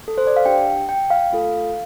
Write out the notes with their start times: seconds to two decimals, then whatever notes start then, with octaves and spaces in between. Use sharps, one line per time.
0.08 A4
0.18 C5
0.27 D5
0.36 F5
0.45 D4 G4 G5
0.89 G5
1.10 F5
1.32 A3 F4 A4